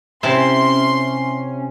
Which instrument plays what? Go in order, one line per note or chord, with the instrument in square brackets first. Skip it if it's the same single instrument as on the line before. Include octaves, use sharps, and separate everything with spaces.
[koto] C3 E4 [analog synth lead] C#4 [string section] C6